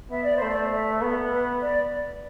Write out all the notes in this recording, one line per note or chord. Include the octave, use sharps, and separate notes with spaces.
B3 E5
D5
C5
A3
D5
E5
B3
B4
D5